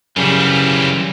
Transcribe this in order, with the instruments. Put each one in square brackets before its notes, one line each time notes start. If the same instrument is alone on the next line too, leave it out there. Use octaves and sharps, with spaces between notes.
[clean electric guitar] F#2 C#3 G3 [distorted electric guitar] E3 F4